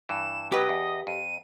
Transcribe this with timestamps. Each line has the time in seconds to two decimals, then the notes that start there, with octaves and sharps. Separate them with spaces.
0.09 G2 E3 E7
0.52 B2 F#3 G4 B4 D#5
0.69 E2
1.07 F2 D#7